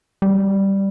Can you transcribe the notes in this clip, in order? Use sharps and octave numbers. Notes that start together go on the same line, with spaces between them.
G3